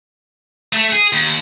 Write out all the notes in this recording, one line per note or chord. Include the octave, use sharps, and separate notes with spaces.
A3
G#4
D#2